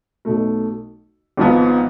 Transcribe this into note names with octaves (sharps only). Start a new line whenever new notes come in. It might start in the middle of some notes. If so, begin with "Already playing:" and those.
B1 B2 A3
G#1 G#2 F3 B3